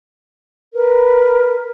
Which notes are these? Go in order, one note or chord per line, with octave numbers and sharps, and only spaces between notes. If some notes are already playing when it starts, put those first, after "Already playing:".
A#4 B4